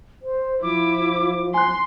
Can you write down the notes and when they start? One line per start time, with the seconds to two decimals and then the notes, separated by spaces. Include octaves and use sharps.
0.22 C5
0.62 F3 E4 D6
1.54 G#5 C6 F#6